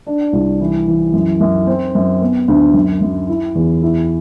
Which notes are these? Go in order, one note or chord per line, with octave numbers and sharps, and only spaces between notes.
D4
C2
E3
E3
F#2
F#2
C4
F#2
B3
D2
F#2
F#2
E4
E2
E4